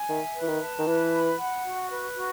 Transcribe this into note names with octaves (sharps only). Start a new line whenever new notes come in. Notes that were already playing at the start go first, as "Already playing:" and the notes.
Already playing: G#5
D#3 E5
B4
E3
D#3
A5
D#3
E3 B4
B5
F#5
F#4
B4
F#4